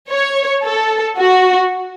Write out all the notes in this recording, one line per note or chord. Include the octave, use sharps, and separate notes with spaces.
C#5
A4
F#4